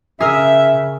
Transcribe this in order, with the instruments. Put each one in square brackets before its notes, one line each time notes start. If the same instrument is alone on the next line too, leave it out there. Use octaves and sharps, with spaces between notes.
[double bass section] C#3 [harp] G#4 A#4 [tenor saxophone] E5